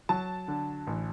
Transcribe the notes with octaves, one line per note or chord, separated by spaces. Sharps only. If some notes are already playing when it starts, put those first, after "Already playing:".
F#3 A5
D3
A1